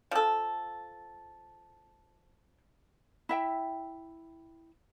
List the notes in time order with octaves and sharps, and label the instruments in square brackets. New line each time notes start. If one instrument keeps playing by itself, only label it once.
[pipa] F3 A4
[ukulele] E4 E5 G5